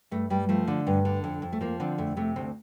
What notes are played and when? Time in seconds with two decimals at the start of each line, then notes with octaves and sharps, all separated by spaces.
0.11 G2 A3
0.30 G2 G3
0.49 F3 A3
0.67 D3
0.87 G2
1.05 D3
1.24 F2
1.42 F2
1.52 A3
1.61 F3 A#3
1.80 D3 C4
1.98 F2 A3
2.17 C3 A3
2.36 D2 C4